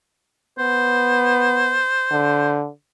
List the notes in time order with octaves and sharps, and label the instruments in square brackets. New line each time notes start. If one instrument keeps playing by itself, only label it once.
[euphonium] B3 [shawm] C5
[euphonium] D3